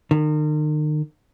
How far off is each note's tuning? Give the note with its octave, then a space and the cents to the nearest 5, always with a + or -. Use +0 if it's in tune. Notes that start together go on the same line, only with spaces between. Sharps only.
D#3 -40